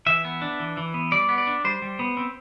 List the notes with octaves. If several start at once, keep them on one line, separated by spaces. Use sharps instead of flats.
E3 E5
B3
D4
E3
E3
B3
G3 D5
B3
D5
D4
G3 C5
G3
B3
C4